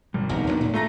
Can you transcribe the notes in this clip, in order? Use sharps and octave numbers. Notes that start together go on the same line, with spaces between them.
G#1 C3 G3
E1 C2 B3 D#4 A#4
D#2 G#3 D4
A2
A3 F4 A4 A#5 A#6